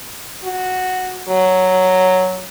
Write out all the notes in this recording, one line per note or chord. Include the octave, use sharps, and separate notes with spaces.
F#4
F#3